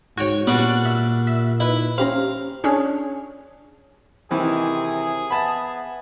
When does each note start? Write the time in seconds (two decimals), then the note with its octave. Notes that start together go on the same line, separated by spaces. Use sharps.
0.18 G#2 F#4 C#5 G5 G#5
0.47 A#2 G3 B3 D4 F#4
0.85 E5
1.27 E5
1.60 D#4 E4 B4
1.98 C#4 G4 C5 F5 A#5
2.64 C#4 D4 G#4 C#5
4.31 C3 D#3 E3 C4 G#4
5.30 B3 E5 A5 B5